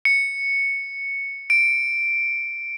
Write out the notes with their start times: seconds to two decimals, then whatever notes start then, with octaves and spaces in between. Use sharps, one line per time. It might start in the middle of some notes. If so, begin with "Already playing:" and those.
0.05 C#7
1.50 D7